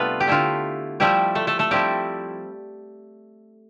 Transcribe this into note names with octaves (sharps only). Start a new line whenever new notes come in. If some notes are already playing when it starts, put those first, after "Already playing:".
Already playing: C3 G3 A3 B3 D4 F4 A4 B4
G4
D3 A3 E4 F4
F3 G3 A3 E4 G4
A3 A4
A3 A4
A3 A4
F3 G3 C4 E4 G4